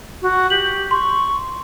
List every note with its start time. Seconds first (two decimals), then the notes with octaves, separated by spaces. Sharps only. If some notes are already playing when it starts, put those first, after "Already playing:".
0.22 F#4
0.50 G4 F#7
0.91 C6 C#6